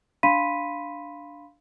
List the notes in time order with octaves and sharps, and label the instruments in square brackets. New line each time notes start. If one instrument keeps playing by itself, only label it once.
[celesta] D4 F5 B5 C6 B6 D#7